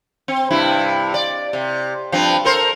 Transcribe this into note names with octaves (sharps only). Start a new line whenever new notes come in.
C4
G2 C3 E4
D5
C3
G2 F3 C4
A4 A#4 C5